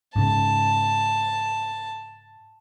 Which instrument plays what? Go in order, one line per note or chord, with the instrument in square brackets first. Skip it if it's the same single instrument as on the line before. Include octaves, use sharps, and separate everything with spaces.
[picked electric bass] G#2 C#3 [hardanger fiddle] A5